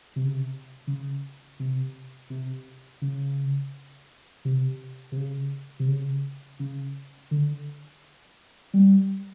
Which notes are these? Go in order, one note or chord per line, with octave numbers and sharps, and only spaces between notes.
C3
C#3
C3
C#3
C3
C3
C#3
C3
C3
C#3
C3
C#3
C#3
D3
G3